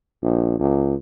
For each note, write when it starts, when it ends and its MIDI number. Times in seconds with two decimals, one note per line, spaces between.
0.23 0.58 34
0.60 0.95 37